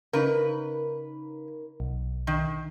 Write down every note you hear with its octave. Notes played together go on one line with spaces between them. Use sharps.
C#3 D#4 A#4 B4
B1
D#3